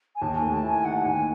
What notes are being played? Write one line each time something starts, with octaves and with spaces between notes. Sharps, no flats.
G#5
D#2 A5
G#5
A3
A5
E4
G#5
D#3 F#5
D#2 G#5